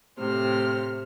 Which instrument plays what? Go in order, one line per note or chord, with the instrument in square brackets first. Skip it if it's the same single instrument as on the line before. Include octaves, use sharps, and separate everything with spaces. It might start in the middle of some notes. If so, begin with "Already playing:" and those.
[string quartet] A2 C3 C5 F6